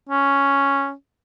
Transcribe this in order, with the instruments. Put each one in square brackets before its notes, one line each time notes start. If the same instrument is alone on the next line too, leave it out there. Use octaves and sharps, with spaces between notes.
[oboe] C#4